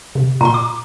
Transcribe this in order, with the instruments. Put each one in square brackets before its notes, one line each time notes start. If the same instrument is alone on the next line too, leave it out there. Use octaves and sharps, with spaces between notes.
[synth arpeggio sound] C3
[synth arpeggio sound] A#2 C6 [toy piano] A#5
[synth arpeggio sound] D6